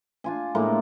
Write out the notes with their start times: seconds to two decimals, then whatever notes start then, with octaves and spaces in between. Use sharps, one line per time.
0.24 D4 F4 G#5
0.55 A2 G#3 A#3